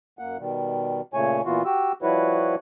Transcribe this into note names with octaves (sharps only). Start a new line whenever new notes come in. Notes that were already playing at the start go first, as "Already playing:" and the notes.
F#2 A#3 F#5
B2 D#3 G3
A#2 C#3 A3 C#5 G#5
A#2 E3 B3 F4 F#4
F#4 G4 E6
F3 G3 E4 F#4 B4 C#5